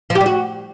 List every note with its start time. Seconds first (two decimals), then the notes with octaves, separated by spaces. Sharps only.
0.10 F3
0.15 G4
0.21 G3
0.26 F#4